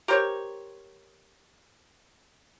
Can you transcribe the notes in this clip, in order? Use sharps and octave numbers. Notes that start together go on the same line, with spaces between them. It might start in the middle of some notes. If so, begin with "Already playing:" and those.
G4 A#4 C5 C#5